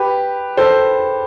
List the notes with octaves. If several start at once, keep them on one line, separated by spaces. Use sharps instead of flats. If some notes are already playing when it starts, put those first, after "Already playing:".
Already playing: G4 B4
A4 C5